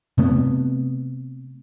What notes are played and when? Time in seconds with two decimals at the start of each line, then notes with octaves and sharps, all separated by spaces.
0.18 C3 A3 B3